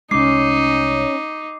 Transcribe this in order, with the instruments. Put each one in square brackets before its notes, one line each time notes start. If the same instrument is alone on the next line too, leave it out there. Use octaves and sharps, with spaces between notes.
[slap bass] C2 G#3 [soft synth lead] C#4 [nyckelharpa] D#4 [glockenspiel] D6 C7